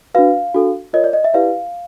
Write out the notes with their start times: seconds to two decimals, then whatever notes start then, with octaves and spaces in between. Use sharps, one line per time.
0.15 D4 F#4 B4 F5
0.54 D4 F#4 A4
0.93 F4 A#4 C#5 D#5
1.04 D5
1.13 D#5
1.24 E5
1.34 E4 G4 B4 D5 F5